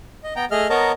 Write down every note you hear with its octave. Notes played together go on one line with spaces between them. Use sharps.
D#5
B3 G5 A#5
A3 G#4 D#5 F6
B3 A#4 C#5 D#5 A5 A#5